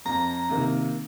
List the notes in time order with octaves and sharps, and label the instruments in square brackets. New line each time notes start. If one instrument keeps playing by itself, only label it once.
[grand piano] F2 [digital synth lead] A#5
[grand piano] C3 D#3 A#3